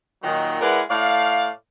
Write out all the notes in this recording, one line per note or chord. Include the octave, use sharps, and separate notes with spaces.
A#2 D#3 F#3
G#3 E4 A#4 B4 D5 F#5
A2 A3 D5 F5